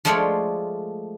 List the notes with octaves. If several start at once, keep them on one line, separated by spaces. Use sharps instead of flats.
F3 G#3 A3 F4 C#5 D5